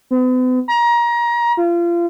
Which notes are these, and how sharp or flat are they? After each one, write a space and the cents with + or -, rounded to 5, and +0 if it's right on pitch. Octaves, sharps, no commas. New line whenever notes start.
B3 +45
A#5 +25
F4 -30